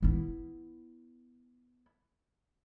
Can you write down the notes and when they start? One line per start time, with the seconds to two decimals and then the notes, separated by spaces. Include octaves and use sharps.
0.02 B3 E4